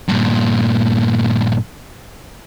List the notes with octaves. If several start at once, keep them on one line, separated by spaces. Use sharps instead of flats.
G2 A#2